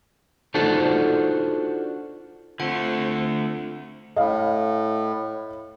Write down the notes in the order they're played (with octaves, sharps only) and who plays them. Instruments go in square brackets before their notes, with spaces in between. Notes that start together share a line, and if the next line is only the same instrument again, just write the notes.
[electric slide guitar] D4 D#4 F4 F#4 A4 C5
[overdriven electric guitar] D3 A3 [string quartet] C4 [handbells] F4 F#5
[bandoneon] A2 [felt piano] D#5 F5